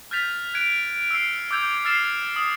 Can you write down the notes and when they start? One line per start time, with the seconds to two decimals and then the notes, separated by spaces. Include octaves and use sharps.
0.11 F6 G6 A6 B6 F7
0.54 F#6 G#6 D7
1.11 E6 C7
1.51 D6 E6 G6 G#6 F7
1.85 E6 F6 A6 C7 E7
2.36 D#6